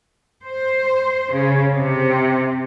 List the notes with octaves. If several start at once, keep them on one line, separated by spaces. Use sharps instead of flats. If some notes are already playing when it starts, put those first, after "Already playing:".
C5
C#3
C3